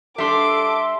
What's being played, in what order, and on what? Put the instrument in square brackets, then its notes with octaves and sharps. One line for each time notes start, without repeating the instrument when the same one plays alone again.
[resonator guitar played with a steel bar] G3 D4 [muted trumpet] A4 [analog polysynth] E5 C6 [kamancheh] D6